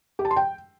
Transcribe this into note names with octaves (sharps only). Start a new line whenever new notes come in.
G4
A5
C6
G5